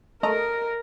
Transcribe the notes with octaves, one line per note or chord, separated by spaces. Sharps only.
A3 A#4 D#5 A#5